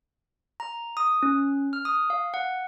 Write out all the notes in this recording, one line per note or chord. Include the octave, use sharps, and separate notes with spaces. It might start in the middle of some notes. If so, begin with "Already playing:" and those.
A#5
D#6
C#4
F6
D#6
F5
F#5